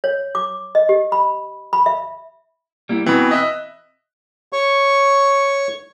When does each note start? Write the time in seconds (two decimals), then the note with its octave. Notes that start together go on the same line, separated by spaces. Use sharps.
0.04 C#5
0.35 D6
0.75 D#5
0.89 G4
1.12 B5
1.73 B5
1.86 E5
2.89 G3 A#3 E4
3.06 B2 E3 C4 B5
3.31 D#5 E5 F#6
4.53 C#5 C#6